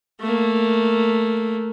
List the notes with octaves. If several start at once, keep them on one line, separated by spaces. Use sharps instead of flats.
A3 A#3